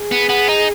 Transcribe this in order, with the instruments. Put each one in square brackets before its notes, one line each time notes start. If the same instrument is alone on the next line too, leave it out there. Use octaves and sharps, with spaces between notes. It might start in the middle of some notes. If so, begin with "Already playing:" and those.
Already playing: [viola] G#4
[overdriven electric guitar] B3
B3
D#4